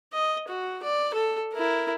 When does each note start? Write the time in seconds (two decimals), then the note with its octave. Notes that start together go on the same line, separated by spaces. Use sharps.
0.13 D#5
0.48 F#4
0.83 D5
1.14 A4
1.54 E4 A#4